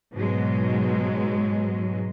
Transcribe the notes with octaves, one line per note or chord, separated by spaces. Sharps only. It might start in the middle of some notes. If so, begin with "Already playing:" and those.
G#2 B2 F#3 G#3